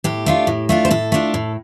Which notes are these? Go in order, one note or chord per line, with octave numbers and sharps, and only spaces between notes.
A2 G4
A3 D4 F4
A2
A3 D4 F4
C5
A2 A4
A3 D4 F4
A2